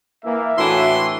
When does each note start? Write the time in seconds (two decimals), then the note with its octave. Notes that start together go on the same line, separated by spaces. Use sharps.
0.25 E3 A#3 E5
0.58 A2 E3 D4 E4 F#4 C6